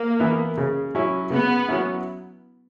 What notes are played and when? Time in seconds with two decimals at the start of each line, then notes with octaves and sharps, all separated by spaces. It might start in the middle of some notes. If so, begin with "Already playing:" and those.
Already playing: A#3
0.20 E3 B3 E4
0.58 C#3
0.95 F#3 C#4 E4
1.30 C#3 B3
1.69 F#3 C#4 E4